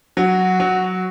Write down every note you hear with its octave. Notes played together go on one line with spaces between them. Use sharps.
F#3 F#4
F#3